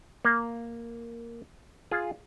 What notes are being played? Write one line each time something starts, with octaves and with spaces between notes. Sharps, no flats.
A#3
F4 G#4